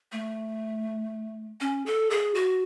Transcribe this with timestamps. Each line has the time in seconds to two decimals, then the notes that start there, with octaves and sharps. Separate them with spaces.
0.12 A3
1.61 C#4
1.86 A4
2.10 G#4
2.35 F#4